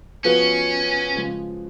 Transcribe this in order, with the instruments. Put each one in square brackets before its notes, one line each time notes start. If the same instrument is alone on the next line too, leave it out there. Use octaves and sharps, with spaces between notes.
[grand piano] F3 B3 F#4 B4 [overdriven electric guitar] C#4
[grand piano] C#3 F3 G#3